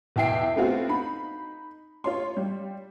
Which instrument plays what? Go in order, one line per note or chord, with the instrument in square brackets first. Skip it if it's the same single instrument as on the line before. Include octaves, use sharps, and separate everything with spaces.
[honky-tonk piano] B1 E2 E5 G5 C7 D7
A3 B3 C4 F4 F#4
D#4 B5
F4 C#5 C6
G3